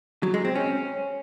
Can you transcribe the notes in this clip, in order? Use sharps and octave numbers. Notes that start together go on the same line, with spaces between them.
F#3
G#3
C4
C#4